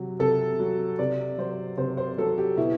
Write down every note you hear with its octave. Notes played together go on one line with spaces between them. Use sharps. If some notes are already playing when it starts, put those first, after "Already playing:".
Already playing: C3 F#3
C3 A4
F#3
C3 D5
F#3 C5
C3 C5
C5
F#3 A4
G4
B2 E4